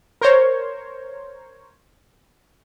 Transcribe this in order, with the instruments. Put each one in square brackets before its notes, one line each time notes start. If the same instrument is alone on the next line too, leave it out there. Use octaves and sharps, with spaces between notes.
[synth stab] A#4 C5 C#5